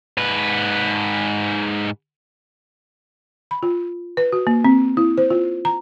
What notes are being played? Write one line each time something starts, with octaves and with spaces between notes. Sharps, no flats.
G#2 B4
B5
F4
B4
F#4
A#3
C4
E4
C5
F4
A#5